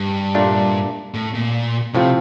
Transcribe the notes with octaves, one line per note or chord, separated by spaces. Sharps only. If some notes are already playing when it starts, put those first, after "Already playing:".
Already playing: G2
A#2 A3 D4 F4
A2
A#2
A2 C3 F3 C4 F4